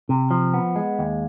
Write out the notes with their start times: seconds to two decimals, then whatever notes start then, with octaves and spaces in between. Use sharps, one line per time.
0.09 C3
0.31 F3
0.54 B3
0.76 G#3
0.99 D#2